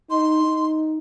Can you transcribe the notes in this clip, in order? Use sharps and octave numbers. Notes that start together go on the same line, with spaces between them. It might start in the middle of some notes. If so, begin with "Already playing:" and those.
D#4 C6
D#4